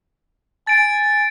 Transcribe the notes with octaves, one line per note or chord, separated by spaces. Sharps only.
G#5 A6 D7